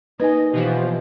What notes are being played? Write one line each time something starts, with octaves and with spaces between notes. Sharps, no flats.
A#3 D#4 B4 D#5 G#5
B2 E3 F3 G4 C5